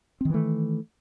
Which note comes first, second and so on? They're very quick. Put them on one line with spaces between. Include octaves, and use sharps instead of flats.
C4 D#3 E3 A3